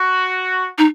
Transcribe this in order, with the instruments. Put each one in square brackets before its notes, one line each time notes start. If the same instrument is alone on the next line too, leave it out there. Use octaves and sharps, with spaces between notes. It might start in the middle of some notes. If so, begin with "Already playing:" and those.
Already playing: [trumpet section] F#4
[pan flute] D#4